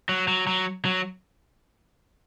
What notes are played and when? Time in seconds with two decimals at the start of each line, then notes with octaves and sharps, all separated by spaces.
0.09 F#3
0.28 F#3
0.47 F#3
0.85 F#3